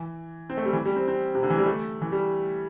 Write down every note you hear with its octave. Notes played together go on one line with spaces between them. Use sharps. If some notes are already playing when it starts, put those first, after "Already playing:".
Already playing: E3
C4
A3
G3
E3
G3
C4
C4
C3
D3
E3
G3
A3
E3
G3